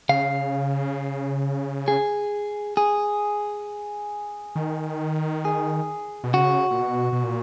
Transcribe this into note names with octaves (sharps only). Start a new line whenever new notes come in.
C#3 F5
G#4
G#4
D#3
G#4
B2
C#3 F#4
A#2
B2
B2
A#2